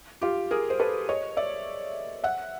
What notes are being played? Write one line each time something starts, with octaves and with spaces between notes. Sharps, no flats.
F4 G4
G#4 A#4
C5
A4 B4
C#5 D#5
D5 E5
E5 F#5